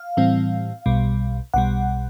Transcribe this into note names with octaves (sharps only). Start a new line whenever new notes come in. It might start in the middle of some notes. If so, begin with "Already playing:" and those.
Already playing: F5
A2 E3 G3 C4
B1 B2 G3
B1 B2 G3 F#5